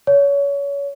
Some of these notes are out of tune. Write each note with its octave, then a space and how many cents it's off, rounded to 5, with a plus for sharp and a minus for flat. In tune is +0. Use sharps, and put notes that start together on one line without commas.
C#5 +30